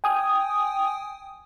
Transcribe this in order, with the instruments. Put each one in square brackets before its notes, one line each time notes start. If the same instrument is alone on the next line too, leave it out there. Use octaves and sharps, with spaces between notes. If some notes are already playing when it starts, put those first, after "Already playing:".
[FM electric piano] G5 G#5 D#6